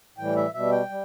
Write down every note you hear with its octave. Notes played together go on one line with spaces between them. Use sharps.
A2 E3 G3 G5
E5
B2 G3 E5
G5
G3